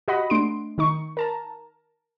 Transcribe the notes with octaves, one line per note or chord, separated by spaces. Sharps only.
F#4 G4 D#5 F#5 B5
A3 D4 C6 D7
D#3 D#4 C#6
A#4 A5 A#5